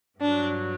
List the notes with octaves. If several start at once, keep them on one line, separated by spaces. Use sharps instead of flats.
G2 F#3 D4